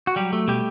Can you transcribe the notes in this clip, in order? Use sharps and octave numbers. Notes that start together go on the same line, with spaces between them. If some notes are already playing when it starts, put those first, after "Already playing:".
F#4
F#3 G3 G4
A3
B2 G3 G4